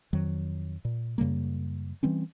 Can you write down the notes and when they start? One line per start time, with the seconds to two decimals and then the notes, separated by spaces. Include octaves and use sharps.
0.13 F2 D#3 F#3
0.85 A#2
1.18 F#2 C#3 G3 A#3
2.03 E3 G3 C4 C#4